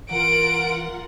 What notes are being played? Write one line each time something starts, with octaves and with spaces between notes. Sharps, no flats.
E3 F4 A#4 F#5 D7